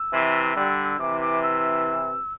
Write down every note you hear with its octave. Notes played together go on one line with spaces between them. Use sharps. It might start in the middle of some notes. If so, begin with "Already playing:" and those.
Already playing: E6
C3 E3
D3 G3
C3 E3 D6
D6
E6